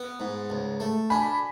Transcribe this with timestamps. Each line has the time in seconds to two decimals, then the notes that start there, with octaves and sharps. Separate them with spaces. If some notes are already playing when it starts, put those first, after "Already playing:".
Already playing: B3
0.20 G#2
0.50 C#2
0.80 A3
1.10 D4 G#5 B5